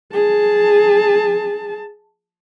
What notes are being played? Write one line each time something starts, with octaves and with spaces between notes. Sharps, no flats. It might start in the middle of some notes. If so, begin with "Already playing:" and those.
G#4 A5